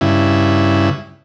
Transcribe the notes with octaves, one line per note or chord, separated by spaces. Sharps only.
G2 C#3 E4